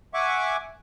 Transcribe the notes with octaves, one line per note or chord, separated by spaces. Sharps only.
E5 F#5 G#5 C#6 D6